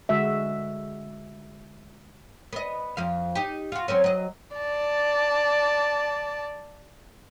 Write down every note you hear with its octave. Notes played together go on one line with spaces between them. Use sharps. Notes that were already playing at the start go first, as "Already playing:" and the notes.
D3 G#3 F#4 E5
B3 D#5
F2 F3 F5
D#4 G4
F4 F#4
F#3 C4 C#4
F#3 D#5
D5 A5